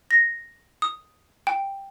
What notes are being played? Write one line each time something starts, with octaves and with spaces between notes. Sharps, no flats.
A#6
D#6
G5